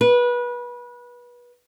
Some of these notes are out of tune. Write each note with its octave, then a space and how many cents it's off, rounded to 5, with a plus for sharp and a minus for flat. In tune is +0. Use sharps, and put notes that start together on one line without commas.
B4 -25